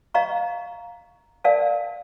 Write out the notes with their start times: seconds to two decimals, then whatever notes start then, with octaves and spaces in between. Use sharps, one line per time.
0.14 D#5 F5 A#5 C#6
1.44 A#4 D5 F5 G#5 A5